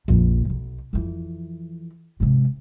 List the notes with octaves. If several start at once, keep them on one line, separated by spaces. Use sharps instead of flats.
A#1 F2
B1
F2 E3
G#2 C3